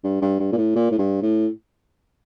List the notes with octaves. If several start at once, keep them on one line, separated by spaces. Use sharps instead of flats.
G2
G2
G2
A#2
A2
A#2
A2
G2
A2